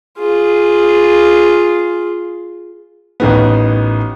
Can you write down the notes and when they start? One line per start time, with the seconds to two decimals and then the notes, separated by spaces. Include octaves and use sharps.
0.20 F4 G#4
3.20 A1 D#3 B3